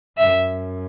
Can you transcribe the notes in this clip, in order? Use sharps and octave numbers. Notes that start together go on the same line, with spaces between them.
F#2 E5